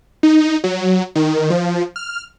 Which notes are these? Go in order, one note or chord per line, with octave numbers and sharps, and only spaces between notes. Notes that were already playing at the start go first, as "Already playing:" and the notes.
D#4
F#3
D#3
F3
F6